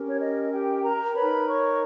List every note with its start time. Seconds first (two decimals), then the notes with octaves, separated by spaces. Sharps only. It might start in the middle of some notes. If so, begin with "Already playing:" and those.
Already playing: C#4 G4 A#4
0.09 C#5
0.20 D#5
0.52 G4 G5
0.84 A#4 A#5
1.12 A#5
1.16 D#4 A#4 B4 C#5 B5
1.47 C#5 C#6